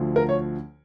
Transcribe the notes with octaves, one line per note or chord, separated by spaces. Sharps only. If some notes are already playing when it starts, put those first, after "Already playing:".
Already playing: D2 D3 F3
A#4
C#5